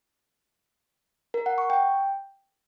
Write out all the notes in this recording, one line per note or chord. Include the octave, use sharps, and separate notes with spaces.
A#4
F#5
C#6
G5